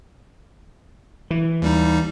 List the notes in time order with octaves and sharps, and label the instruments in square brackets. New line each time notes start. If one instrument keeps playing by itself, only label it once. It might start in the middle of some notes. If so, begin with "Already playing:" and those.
[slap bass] E3
[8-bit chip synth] D#2 G3 D#4